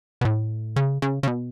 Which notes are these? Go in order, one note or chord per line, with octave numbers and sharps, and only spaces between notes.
B2
A2
C#3
C#3
C#3
B2